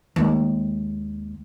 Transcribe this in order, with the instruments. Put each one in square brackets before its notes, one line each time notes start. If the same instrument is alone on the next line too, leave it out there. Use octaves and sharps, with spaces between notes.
[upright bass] D#2 G#3